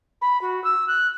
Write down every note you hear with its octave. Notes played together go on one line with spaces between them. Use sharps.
B5
F#4
E6
F#6